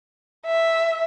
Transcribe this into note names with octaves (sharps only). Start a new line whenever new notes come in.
E5